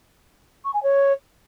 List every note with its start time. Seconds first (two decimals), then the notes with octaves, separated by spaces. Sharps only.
0.64 C#6
0.73 G#5
0.82 C#5